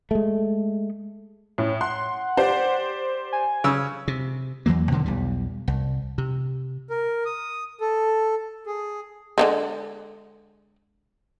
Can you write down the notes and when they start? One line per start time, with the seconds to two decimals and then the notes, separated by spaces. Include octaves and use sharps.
0.11 G#3 A3
1.58 A2 C#4
1.81 F#5 C6
2.37 G4 C5 D5
3.33 G#5
3.64 C#3 E6
4.08 C3
4.66 E2 E3 F#3 A#3
4.91 B2 D3 D#3 F#3
5.06 B1 E2 G3
5.68 C2
6.18 C3
6.90 A#4
7.26 D#6
7.81 A4
8.66 G#4
9.38 D3 F3 G#3